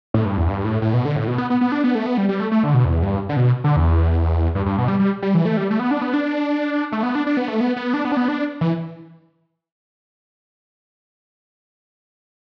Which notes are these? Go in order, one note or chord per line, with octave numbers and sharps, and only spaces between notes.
A2
G2
E2
G2
A2
A2
B2
D3
A2
B2
B3
B3
B3
D4
B3
A3
B3
G3
G3
A3
A3
D3
B2
E2
G2
D3
B2
D3
E2
G2
G2
B2
G3
G3
G3
E3
A3
G3
A3
B3
D4
B3
D4
A3
B3
D4
D4
B3
A3
B3
B3
D4
B3
D4
B3
D4
E3